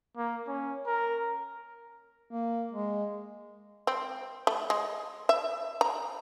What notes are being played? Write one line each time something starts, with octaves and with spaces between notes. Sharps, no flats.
A#3
C#4
A#4
A#3
G#3
C4
A3
G#3
E5
A#5